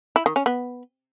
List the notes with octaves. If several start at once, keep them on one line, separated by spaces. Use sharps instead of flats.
E4
D#3
C#4
B3